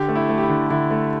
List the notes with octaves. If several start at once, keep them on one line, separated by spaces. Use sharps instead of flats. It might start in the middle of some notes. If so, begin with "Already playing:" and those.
Already playing: D3 G4
A3
E4
A3
G4
E4
D3
D3 E4
A3